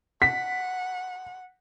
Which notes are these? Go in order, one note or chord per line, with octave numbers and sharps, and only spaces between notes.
F#5 B6